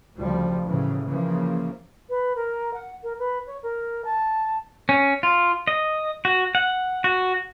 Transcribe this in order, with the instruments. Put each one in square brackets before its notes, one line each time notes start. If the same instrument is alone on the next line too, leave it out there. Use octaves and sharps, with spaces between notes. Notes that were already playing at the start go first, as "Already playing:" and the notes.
[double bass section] D2 C#3 F3 G3
A2 C#3 E3 F#3
C#3 E3 F3 A#3
[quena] B4
A#4
F#5
A#4
B4
C#5
A#4
A5
[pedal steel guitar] C#4
F4
D#5
F#4
F#5
F#4